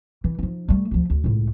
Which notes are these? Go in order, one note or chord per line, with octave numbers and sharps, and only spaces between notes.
E3
F3 D#4
G3 A3
D2 F3
D2
C#2 A2